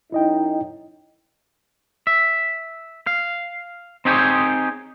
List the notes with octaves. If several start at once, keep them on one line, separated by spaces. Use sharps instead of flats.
F#2 D#4 E4 D#5 G5
E5
F5
C4 D#4 G4 G#4 C5 C#5